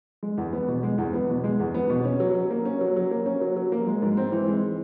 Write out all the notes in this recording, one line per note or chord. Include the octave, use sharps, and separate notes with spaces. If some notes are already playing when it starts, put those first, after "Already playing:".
G#3
E2
B3
B2
G#3
E2
B3
B2
G#3
E2
B3
B2
C#4
F#3
F#3
A#3
C#4
F#3
F#3
A#3
C#4
F#3
F#3
A#3
G#3
G#2
C4
E3
G#3